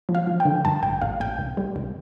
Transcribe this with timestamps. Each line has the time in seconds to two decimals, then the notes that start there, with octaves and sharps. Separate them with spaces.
0.09 F3
0.15 F5
0.27 F3
0.40 G5
0.45 D3
0.65 G2 A5
0.82 A1 G5
1.01 A1 F5
1.20 A1 G5
1.39 C2
1.57 G3
1.76 C2